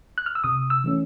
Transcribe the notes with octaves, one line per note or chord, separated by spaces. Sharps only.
F#6
F6
E6
C3 D#6
E6
E3 A3 C#4